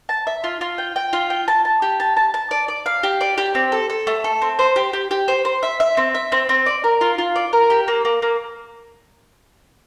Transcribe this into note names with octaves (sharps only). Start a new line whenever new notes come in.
A5
E5
F4
F4
G5
G5
F4
G5
A5
A5
G4
A5
A5
A5
D5
D5
F5
G4
D5
G4
C4
A4
A4
A3
A4
C4
C5
G4
G4
G4
C5
C5
E5
E5
C4
E5
C4
C4
D5
A#4
F4
F4
D5
A#4
G4
A#3
A#3
A#3